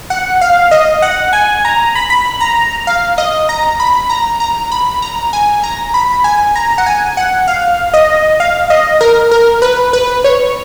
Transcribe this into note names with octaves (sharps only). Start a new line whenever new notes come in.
F#5
F5
D#5
F#5
G#5
A#5
B5
B5
A#5
F5
D#5
A#5
B5
A#5
A#5
B5
A#5
G#5
A#5
B5
G#5
A#5
F#5
G#5
F#5
F5
D#5
F5
D#5
A#4
A#4
B4
B4
C#5